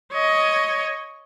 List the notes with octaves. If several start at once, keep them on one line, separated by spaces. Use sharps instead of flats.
C#5 D#5